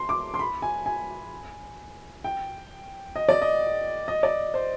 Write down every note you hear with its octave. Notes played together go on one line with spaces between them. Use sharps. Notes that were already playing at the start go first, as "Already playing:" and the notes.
Already playing: C6
D6
C6
B5
G#5
G#5
G5
D#5
D5
D#5
D#5
D5
C5